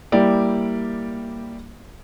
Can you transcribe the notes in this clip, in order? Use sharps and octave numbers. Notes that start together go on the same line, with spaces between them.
G3 A#3 E4 G4 D5